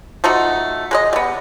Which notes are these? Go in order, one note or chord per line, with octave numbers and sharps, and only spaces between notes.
F3 A3 D#4 F#4
G#3 B4 D#5
G3 B3